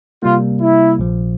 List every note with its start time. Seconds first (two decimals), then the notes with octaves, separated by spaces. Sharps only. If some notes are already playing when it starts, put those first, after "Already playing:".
0.23 C3 G3 A#3 F4
0.61 E4
0.99 A#1 A#2 F3